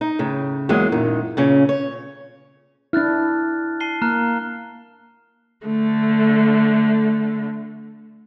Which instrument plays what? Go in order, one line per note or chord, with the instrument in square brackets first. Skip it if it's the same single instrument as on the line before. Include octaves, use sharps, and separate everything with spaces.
[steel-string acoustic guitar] D#4
A2 C#3
E2 F#3 G#3 A#3
F#2 A#2 D#3
A#2 C#3 C#4
C#5
[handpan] D4 E4 [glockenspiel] F6 F#6 A6
[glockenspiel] A5 C7 G7
[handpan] A#3 [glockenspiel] A#5 F6 F#6
[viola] D3 A3